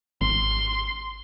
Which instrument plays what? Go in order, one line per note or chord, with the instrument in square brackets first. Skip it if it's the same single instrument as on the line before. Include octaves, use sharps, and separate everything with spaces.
[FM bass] G#1 [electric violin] C6